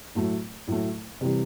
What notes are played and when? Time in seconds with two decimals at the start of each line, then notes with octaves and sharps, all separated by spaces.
0.15 A2 F#3 A3
0.68 A2 F#3 A3
1.21 C3 E3 G3